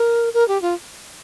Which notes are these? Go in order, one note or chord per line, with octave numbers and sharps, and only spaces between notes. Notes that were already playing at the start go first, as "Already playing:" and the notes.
Already playing: A#4
A#4
G4
F4